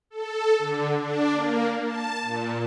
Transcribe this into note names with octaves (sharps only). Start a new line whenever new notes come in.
A4
D3
D4
A#3
A5
A#2